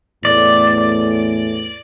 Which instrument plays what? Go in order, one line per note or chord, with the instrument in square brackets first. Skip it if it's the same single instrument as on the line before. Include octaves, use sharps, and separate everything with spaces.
[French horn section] E2 A2 [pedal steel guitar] D5